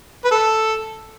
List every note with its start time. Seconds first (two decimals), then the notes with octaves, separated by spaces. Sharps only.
0.24 B4
0.31 A4